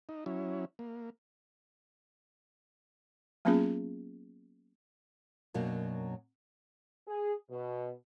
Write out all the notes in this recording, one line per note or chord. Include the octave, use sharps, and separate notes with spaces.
D#4
F#3 C#4 E4
A#3
F#3 A#3 B3 C#4 F4 G#4
F#2 B2 F#3 A#3 D4
G#4
B2